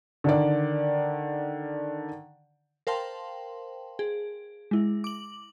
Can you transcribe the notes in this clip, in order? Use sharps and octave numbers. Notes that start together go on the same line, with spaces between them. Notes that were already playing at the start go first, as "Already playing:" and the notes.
D3 D#3 D5
A#4 C5 F5 G5 A5 C6
G#4
G#3 E4
D6 F#7